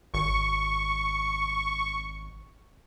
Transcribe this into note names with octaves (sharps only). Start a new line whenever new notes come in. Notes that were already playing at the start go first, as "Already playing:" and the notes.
G#1 C#6